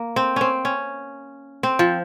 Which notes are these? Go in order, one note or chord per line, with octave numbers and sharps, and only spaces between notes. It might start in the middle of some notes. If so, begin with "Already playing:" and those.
Already playing: A#3
C4
C4 C#4
C#4
C4
F3